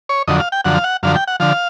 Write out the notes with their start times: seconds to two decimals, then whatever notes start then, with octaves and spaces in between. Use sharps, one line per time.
0.09 C#5
0.28 F2 D3 F#3 D#5
0.40 F5
0.52 G5
0.65 F#2 D3 F3 F#5
0.75 F5
0.84 F#5
1.03 F#2 D3 F3 F5
1.15 G5
1.28 F#5
1.40 D3 F3 F5